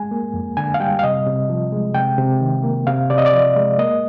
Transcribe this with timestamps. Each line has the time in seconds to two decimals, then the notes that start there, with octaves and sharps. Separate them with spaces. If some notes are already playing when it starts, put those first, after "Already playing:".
Already playing: G#3 G#5
0.11 A#3
0.34 F2
0.57 D3 G#5
0.74 F5
0.80 G3 G5
0.99 F5
1.03 C3 D#5
1.26 C3
1.50 F3
1.72 G#3
1.94 C3 G5
2.18 C3
2.41 D#3
2.64 A#3
2.87 C3 F5
3.10 C3 D5
3.18 D#5
3.26 D5
3.33 F3
3.56 G#3
3.79 A#3 D#5